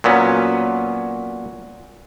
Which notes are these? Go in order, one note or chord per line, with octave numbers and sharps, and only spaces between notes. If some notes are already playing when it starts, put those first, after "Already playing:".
A#2 F#3 B3 C#4